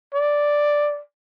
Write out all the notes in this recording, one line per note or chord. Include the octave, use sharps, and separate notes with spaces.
D5